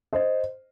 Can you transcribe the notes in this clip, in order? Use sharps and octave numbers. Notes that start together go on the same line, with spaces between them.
C5 D#5